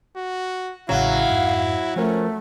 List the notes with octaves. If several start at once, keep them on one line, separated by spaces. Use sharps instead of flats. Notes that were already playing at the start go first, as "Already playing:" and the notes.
F#4
A1 A2 C#3 F#3 E4 F5
F2 G#2
F3 A3 C#4 A#4